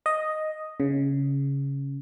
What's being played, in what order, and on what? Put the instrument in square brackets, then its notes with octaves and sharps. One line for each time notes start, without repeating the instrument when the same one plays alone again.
[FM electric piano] D#5
C#3